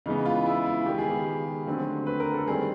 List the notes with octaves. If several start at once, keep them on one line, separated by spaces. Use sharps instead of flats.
C#3 E3 G#3 B3 D#4
F4
E4
F4
D#3 G#3 B3 G4
G#4
G4
D3 F#3 A3 C4
B4
A#4
A4
D#3 G3 C4 G#4